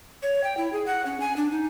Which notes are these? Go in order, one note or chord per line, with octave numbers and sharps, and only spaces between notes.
C#5
G5
E4
G#4
F#5
C#4
G#5
D4
D#4